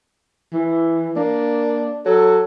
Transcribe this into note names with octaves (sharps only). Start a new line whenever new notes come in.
E3
A#3 D4
F#3 A4